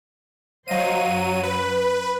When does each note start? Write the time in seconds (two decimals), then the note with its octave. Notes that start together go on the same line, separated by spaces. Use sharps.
0.68 F#3 C5 D#5 F5 D#7
1.03 F#2
1.43 B4